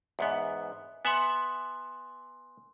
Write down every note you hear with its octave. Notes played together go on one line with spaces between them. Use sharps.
E2 G#2 B3
B3 E5 F#5 G#5 C6